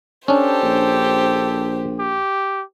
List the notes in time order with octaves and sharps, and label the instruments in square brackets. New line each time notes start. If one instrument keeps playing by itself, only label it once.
[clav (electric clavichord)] C#4 D4 [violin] G4 C5 [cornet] A4
[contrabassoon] A#1
[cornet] G4